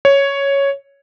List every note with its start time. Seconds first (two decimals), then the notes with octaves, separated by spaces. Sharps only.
0.05 C#5